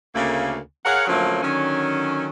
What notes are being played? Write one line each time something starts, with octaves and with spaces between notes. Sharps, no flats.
D2 C#3 A3 A#3
G#4 A#4 C#5 F5 F#5
D3 F3 F#3 A3 A#3 C#4
D3 D#3 F#3 C#4